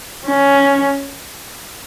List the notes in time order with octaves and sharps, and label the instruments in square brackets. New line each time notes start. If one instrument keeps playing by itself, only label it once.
[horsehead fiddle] C#4